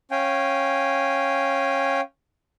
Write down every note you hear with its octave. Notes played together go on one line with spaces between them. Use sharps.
C#4 F5 G5 G#5